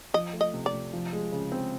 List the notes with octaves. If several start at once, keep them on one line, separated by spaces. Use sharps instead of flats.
F3 D#5
A3
D#5
C3
D5
C3
F3
G#3
C#3
C4